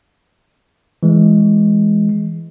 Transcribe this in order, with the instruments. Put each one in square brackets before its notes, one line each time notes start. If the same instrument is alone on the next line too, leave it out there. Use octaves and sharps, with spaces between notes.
[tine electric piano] E3 G#3